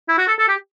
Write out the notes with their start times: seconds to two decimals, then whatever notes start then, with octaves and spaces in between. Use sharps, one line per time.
0.08 E4
0.18 F#4
0.28 A4
0.38 A4
0.48 G4